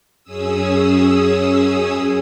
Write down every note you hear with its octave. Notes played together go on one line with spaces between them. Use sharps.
F#2 C#4 G#4 D#6 E6